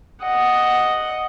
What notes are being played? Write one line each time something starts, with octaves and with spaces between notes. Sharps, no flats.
D#5 F#5